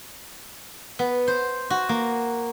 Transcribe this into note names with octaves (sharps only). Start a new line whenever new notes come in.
B3
C5
F#4
A#3